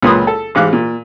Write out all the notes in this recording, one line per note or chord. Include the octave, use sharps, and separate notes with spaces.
C#2 A#2 B4 C6 D#6
A4
A1 G#2 F5 D6 F#6
A#2